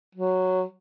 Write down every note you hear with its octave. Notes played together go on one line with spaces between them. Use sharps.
F#3